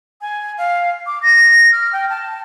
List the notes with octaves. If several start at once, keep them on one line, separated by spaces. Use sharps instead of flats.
G#5
F5
D6
A#6
F6
G5
A5